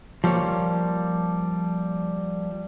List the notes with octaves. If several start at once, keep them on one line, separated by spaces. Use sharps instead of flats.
F3 G3 A#3 C#5